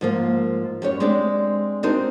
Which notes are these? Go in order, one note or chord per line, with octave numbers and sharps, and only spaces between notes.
G#2 F3 A#3
F#2 G4 C#5
G#3 C4 D4 G4 D5
C4 D4 D#4 F#4 A#4 C5